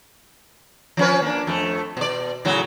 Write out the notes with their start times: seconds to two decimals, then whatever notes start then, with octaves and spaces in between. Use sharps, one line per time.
0.97 F3 C#4 B4
1.22 A#3 D4
1.47 F2 A3
1.97 B2 D5
2.45 A2 C#3 F#3